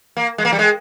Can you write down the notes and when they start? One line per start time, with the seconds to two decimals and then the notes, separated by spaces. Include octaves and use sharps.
0.16 A#3
0.38 G#3
0.45 A#3
0.52 G3
0.59 G#3